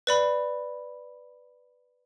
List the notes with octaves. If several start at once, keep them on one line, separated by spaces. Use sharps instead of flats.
B4 D5 B5